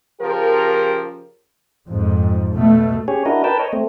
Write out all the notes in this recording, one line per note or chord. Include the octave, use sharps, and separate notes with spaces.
C#3 F3 G4 A#4
F2 G#2
B2 A3
C#4 G4 G#4 C#5
D4 E4 F#4 A#4 D#5
A#4 B4 G5 A5
C#5 D#5
A3 C4